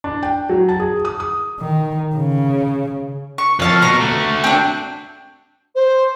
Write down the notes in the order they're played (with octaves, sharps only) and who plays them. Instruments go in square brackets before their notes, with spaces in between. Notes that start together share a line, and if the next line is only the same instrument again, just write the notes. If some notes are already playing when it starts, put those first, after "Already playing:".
[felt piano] D4
G5
F#3
A5
G#4
D#6
D#6
[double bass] D#3
C#3
[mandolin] C#6
[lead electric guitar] F2 [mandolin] C#5 F5 A5
[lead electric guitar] B2 [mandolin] A#5 C#6
[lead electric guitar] A3 F#4
[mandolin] C4 D4
[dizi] C5